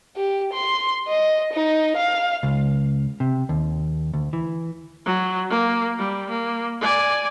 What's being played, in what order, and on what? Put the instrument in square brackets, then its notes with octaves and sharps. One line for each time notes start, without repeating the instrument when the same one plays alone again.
[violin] G4
C6
D#5
D#4
F5
[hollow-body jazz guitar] C#2
C3
D#2
D2
E3
[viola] F#3
A#3
G3
A#3
D5 G#5